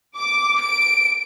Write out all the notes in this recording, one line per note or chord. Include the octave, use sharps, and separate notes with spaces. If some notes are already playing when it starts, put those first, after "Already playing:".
D6
D7